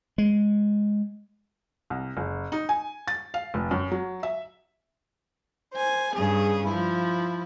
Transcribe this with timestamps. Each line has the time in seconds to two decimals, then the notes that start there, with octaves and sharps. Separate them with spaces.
0.18 G#3
1.90 C2
2.17 F#1
2.52 D#4
2.69 G#5
3.08 A6
3.34 F5
3.54 F1
3.71 F#2
3.92 F#3
4.23 E5
5.73 C5 G#5
6.14 G2 C#3 G#4
6.66 F3 E4